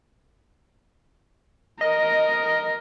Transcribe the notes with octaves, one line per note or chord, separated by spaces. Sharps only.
A#4 D#5